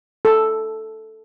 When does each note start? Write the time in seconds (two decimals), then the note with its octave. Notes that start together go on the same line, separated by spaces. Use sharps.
0.25 A4